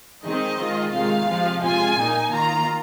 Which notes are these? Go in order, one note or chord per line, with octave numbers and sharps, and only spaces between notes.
D#3 G#3 C4 D#4 D#5
D#3 G#3 F4
C3 D#3 G#3 F4 F5
C3 F3 G#3 F4
C3 G#3 F4 G#5
A#2 A#3 D#4
D#3 A#3 F4 A#5